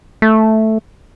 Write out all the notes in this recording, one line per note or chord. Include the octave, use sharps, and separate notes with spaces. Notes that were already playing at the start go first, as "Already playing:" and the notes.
A3